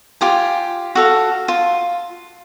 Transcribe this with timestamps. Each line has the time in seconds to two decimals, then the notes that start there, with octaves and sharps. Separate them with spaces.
0.21 F4 G4 G#5
0.95 F#4 A4 F5
1.48 F4